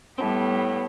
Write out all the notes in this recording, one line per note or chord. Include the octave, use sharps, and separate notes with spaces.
A2 G3 B3 C4